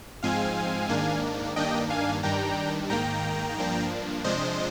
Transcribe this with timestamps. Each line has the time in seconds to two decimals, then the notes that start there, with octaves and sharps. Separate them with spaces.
0.23 G#2 F3 G#3 C4 F5 G#5
0.89 G#2 D#3 A#3 D4
1.56 G2 D#3 A#3 D4 D#5 G5
1.90 F5 G#5
2.23 G2 D#3 G3 D4 G5 A#5
2.90 G#2 D#3 A#3 G5 A#5
3.57 G2 F3 A#3 D4
4.24 C3 F3 G#3 D4 C5 D#5